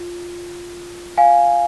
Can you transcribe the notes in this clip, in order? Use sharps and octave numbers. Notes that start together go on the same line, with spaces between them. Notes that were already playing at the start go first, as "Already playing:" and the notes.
Already playing: F4
F5 G#5